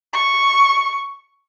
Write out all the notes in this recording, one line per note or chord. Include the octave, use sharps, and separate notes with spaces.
C#6